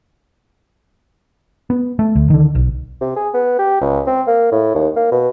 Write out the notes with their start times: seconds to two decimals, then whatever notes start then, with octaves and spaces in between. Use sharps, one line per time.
1.70 B3
1.99 A3
2.16 D2
2.30 D3 D#3
2.55 B1
3.01 C3
3.16 G#4
3.34 B3
3.59 G4
3.81 C#2
4.07 C4
4.27 A#3
4.52 A2
4.75 D#2
4.96 A#3
5.12 B2